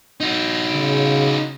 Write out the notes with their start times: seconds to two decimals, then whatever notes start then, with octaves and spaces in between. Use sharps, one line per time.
0.20 D#4 F#4
0.73 C#3